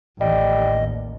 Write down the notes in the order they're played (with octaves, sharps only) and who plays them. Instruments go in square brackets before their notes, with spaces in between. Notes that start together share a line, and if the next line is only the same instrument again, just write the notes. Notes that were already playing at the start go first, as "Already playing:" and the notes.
[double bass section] A1 D#2 [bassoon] G3 [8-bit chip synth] D#5